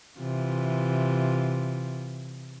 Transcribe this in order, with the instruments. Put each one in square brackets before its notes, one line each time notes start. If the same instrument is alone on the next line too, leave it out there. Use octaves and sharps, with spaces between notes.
[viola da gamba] C3 E3 F4